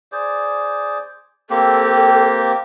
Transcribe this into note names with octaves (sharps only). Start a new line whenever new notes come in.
G#4 C5 D5
A#3 C4 G4 A4